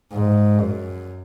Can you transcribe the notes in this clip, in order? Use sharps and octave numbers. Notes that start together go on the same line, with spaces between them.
G#2
F#2